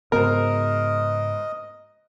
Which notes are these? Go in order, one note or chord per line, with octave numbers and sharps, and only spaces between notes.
G#2 C#3 B3 F#4 A#4 C5 D#5